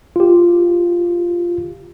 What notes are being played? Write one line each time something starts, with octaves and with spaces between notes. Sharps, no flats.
F4 G4